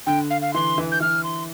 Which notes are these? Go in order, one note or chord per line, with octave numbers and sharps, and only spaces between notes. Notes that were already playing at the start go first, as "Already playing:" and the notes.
D3 G5
F5
F5
E3 C6
E3
G6
E3 F6
C6